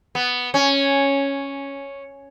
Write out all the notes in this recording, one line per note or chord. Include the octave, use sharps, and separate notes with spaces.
B3
C#4